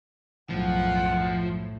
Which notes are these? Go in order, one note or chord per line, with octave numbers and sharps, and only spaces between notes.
B1 F#2 A2 F3 F#5